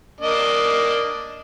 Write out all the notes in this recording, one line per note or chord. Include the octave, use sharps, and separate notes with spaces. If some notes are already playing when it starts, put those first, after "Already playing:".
A#3 D4 D#5